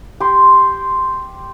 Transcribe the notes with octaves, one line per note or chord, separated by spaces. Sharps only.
G4 C6